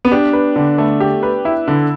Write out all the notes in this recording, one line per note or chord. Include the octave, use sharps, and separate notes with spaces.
B3
D4 G4
B4
D3
A3
G4
B4
E4
D3